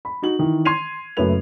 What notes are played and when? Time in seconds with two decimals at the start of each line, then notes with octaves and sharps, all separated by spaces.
0.05 B5
0.22 D#4 F#4 F#7
0.39 D#3 E3
0.65 C6 G#6 C7 D#7 F7
1.17 F#1 F#2 A3 B4 F7